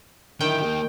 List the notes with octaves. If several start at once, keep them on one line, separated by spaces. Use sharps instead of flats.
D3 D#3 E4 G5
A#3 G4